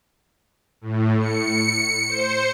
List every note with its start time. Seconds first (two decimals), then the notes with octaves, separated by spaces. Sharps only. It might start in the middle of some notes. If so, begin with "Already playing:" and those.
0.81 A2
1.20 C#7
2.08 C5